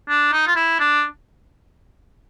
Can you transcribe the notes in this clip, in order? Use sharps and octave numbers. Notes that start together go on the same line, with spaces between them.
D4
D#4
F4
E4
D4